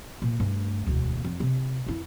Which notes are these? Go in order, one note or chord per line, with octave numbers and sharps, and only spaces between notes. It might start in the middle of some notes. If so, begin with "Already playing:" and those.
A#2
G2 A3
E1 D2
F2
C3
F2 E4